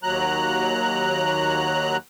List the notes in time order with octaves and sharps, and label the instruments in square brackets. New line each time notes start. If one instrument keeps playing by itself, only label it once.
[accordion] D#2 F#3 A#5 F#6